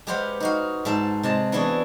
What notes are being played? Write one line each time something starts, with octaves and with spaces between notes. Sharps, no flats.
G#3 G4 B4 C5 F5 F#5
D#4 F#4 F5
G#2 E5 A5
C3 G#3 A5
E3 B3 D4 E4 F#4 G#4